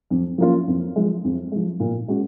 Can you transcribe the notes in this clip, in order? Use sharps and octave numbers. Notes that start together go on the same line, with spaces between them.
F2
F3 A#3 C#4 F4
F2
F3 G#3
F2
F3 G#3
A#2
G#3 C#4 F#4